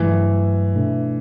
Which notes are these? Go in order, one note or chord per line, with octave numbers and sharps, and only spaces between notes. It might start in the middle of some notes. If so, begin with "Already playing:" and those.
Already playing: G2 E3 F#3 A3
B2 A3 D4